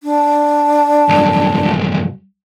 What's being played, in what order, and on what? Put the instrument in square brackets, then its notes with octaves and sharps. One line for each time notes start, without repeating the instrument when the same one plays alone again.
[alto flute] D4
[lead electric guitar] C2 F#2